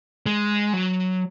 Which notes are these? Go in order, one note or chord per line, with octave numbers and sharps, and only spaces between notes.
G#3
F#3